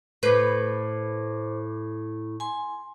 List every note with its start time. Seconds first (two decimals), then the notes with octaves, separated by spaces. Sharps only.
0.23 A2 B4 C5 D6
2.40 G#5 C6